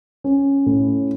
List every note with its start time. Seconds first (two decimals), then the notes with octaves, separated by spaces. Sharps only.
0.24 C#4
0.66 A2